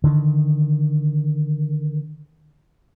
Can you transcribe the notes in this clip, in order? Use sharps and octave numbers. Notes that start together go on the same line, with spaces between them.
D3 D#3